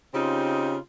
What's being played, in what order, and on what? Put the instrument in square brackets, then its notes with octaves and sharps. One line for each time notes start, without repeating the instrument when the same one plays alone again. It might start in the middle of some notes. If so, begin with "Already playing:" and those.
[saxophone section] C#3 C4 D#4 F4 G4